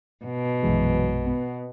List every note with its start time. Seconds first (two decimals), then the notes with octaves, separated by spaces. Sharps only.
0.24 B2
0.63 A#1 F#2 E3 F#3 G#3
1.26 B3